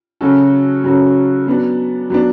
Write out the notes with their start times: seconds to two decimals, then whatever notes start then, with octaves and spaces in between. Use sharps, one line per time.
0.21 C#3 F#3 C#4 F#4 A4
0.84 C#3 F#3 C#4 F#4 A4
1.47 F#3 B3 D4
2.10 F#3 B3 D4